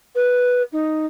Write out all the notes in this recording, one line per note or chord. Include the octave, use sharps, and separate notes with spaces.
B4
D#4